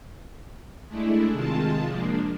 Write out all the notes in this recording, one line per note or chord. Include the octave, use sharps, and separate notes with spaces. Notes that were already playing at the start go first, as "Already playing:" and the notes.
G#3 A3 D4 E4
C3 D#3 G#3 F4 A5
F3 G#3 A#3 D4